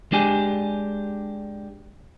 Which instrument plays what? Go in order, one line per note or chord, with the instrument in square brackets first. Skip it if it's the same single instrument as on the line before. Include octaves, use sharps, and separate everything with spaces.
[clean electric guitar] G#3 D4 G4 G#5